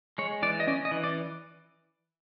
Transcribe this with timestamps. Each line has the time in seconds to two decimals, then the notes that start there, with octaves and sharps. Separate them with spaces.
0.18 G#3 C#5
0.42 E3 D5
0.60 D#5
0.67 C#4 D5
0.85 D#5
0.91 E3
1.04 D5